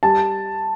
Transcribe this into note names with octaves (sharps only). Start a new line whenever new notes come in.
G3 A5